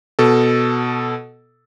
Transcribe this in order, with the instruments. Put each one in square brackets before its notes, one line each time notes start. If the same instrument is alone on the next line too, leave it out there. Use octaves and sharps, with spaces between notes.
[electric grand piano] B2 A4